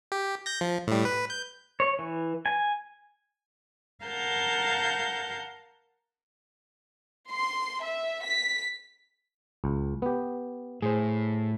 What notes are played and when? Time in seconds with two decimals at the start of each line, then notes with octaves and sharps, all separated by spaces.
0.12 G4
0.46 G6 A#6
0.61 F3
0.87 A2 G3
1.05 B4
1.30 G6
1.80 C#5
1.99 E3
2.46 G#5
4.05 A#4 F5 F#5 A5 A#5 G6
7.32 C6
7.82 E5
8.23 B6
9.64 C#2
10.02 B3 G4
10.82 A2 G#4 C5